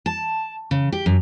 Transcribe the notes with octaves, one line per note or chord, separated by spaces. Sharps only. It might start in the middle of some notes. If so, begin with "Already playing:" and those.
A5
C#3
G4
F#2